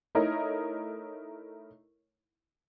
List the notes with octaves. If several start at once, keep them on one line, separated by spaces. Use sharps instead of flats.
A3 D#4 E4 A#4 C#5 D#5